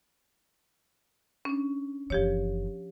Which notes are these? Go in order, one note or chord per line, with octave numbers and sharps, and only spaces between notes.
C#4 D4
F#1 E3 F3 G4 C#5